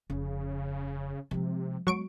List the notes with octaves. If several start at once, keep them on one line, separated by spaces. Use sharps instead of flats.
F1 C#3
C3 F3 G#3
F#3 G#3 B3 C#6 D7